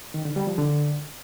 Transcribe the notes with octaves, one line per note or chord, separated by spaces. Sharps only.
D#3
D3
G3
F3
D3